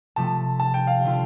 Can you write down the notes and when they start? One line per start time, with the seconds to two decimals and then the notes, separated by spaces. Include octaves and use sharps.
0.16 C3 F3 A3 A5
0.60 A5
0.74 G5
0.87 F5
1.04 D3 A3 F4